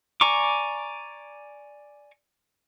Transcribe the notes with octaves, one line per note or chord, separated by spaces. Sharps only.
D5 G#5 A#5 C#6 D6